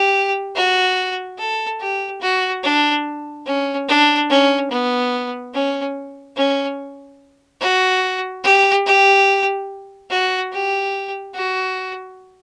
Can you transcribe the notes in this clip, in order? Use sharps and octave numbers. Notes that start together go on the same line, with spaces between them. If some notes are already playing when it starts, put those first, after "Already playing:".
Already playing: G4
F#4
A4
G4
F#4
D4
C#4
D4
C#4
B3
C#4
C#4
F#4
G4
G4
F#4
G4
F#4